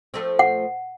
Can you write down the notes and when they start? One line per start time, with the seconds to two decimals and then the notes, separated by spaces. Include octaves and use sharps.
0.14 F3 A3 C4
0.39 F#5